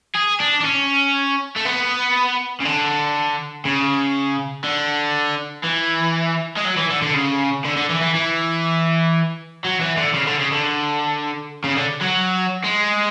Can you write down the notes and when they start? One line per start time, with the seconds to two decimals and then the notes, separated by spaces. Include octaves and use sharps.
0.15 G#4
0.40 D4
0.60 D4
0.64 C#4
1.56 A3
1.65 B3
2.60 C#3
2.65 D3
3.65 C#3
4.64 D3
5.64 E3
6.57 G#3
6.65 F#3
6.77 E3
6.90 D3
7.02 D3
7.14 C#3
7.65 D3
7.77 D3
7.90 E3
8.02 E3
8.15 E3
9.64 F#3
9.80 E3
9.97 D3
10.14 C#3
10.27 D3
10.39 C#3
10.52 D3
11.64 C#3
11.77 D3
12.02 F#3
12.64 G#3